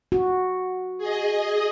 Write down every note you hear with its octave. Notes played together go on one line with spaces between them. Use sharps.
F#4
G#4 D#5